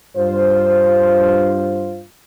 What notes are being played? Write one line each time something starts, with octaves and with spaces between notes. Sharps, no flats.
G2 F4 C5